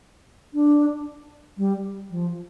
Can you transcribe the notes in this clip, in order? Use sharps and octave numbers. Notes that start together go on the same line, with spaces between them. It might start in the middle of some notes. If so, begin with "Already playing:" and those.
D4
G3
F3